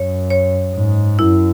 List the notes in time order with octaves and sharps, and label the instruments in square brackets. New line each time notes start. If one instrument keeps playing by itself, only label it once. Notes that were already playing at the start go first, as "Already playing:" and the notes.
Already playing: [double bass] F#2 [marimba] C#5
[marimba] C#5
[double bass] G#2
[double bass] F#2 [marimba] E4